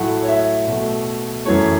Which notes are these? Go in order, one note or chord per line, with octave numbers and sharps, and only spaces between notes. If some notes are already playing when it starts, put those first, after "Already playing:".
Already playing: A2 F#3 A3 F#5
C#5
E5
B2 A3
F#2 E3 A3 C#5